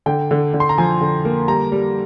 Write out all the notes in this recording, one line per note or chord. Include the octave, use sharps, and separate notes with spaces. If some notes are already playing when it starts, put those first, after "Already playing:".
D3 G5
D3
D3
C6
A#5
F3 G#5
D3
A#3
G3 A#5
G3